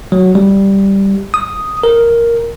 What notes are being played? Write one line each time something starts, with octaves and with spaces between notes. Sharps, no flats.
F#3
G3
D#6
A#4